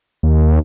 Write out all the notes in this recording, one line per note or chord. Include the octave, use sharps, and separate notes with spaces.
D#2